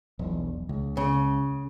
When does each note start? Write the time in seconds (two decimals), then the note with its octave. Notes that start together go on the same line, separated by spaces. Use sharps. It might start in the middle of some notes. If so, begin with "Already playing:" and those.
0.19 E1 B1
0.69 C#2
0.97 C#3